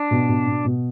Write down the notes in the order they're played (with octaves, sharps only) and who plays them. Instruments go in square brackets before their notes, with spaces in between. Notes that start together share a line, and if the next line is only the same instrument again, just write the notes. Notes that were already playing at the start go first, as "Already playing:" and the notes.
Already playing: [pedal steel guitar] D4
[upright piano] B2
B2
B2
B2